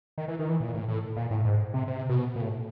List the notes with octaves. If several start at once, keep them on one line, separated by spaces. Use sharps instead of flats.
D#3
E3
D#3
E3
A#2
A2
A2
A#2
A2
G#2
C3
C3
B2
A#2
A2